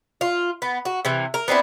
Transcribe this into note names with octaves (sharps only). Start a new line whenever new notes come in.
F4
B3
F#4
C3 E3
A#4
B3 C4 D4 E4